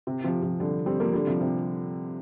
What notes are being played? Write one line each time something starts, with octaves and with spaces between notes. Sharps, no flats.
C3
C3 F3
C3 F3
D3 G3
G3 C4
F3 A#3
D3 G3
C3 F3
C3